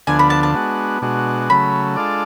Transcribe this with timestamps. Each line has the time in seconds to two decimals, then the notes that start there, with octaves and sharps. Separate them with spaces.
0.07 D2 D3 F3 B3 D4 G#5
0.19 B5
0.30 A5
0.43 A5
0.54 G#3 B3 D4 F#4
1.02 B2 G#3 D4 F#4
1.50 C#3 F#3 A3 B5
1.96 G#3 D4 F4 A4 D5